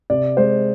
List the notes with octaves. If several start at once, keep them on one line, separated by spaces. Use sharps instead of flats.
C3 D5
G#3 C5